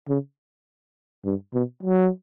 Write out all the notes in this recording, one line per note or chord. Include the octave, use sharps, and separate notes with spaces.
C#3
G2
B2
F#3